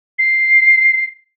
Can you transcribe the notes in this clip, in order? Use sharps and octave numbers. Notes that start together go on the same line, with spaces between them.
C7